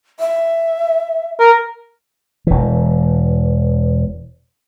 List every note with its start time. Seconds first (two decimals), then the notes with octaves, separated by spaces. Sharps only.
0.20 E5
1.40 A#4
2.47 E1 E3